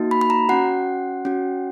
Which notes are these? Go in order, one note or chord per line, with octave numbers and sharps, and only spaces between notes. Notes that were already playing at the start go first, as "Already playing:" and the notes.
Already playing: A#3 D#4 F#4
B5
B5
A#5
C#4 F#4 F#5
C#4 F#4